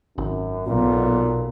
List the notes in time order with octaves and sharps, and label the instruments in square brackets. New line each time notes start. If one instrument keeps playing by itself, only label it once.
[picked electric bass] G#1 [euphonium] F#2
[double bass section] B1 [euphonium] A#2